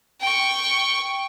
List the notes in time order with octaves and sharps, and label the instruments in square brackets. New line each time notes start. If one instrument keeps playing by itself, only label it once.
[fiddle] G5 C#6